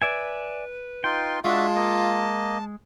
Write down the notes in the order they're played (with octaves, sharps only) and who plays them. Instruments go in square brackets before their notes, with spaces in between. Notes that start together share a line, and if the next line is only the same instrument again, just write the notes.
[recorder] B4 [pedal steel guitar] D5 E5 G#5
[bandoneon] D#4 F4 C6 [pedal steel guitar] G5
[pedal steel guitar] G#3 [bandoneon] D4 F#4 E5 [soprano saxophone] F4 [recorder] A5
[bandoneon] A#3 D#5